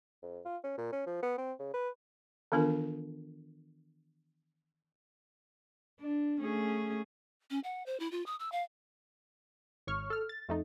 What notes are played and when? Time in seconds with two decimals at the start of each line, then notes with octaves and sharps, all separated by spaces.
0.23 F2
0.45 F4
0.64 C#4
0.78 A#2
0.93 C#4
1.07 F3
1.23 B3
1.38 C4
1.59 C#3
1.74 B4
2.52 D#3 E3 B3 D4 F4 A#4
6.00 D4
6.40 A3 C#4 G#4
7.50 C#4
7.64 F#5
7.86 C5
8.00 E4
8.12 F4
8.26 D#6
8.40 E6
8.52 F5
9.87 G#1 C#5 C#6 F6
10.10 A4 F6
10.29 A6
10.49 F2 A3 D#4